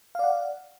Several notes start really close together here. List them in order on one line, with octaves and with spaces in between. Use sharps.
F5 D5 F#5